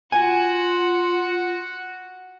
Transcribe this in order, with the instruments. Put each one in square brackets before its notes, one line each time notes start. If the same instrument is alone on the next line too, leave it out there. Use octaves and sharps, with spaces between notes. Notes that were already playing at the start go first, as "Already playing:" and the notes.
[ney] F4 [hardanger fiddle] F#4 [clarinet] F#5 [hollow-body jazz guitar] G#5